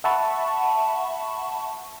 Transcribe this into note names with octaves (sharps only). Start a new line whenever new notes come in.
E5 F#5 A5 B5 C#6